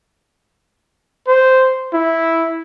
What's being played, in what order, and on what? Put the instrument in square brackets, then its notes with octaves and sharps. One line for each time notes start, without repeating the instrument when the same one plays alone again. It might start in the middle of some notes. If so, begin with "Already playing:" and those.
[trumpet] C5
E4